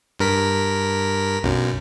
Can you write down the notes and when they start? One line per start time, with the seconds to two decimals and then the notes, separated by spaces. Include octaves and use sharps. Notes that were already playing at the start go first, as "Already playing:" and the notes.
0.19 G2 A#4 B6
1.43 B1 F#2